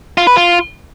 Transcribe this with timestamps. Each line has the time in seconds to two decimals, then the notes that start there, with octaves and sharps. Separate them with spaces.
0.17 F4
0.27 B4
0.37 F4